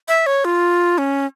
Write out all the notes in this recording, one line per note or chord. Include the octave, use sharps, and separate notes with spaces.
E5
C#5
F4
C#4